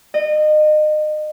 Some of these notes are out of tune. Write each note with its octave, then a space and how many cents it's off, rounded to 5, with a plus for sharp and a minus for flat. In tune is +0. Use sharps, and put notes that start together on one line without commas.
D#5 -30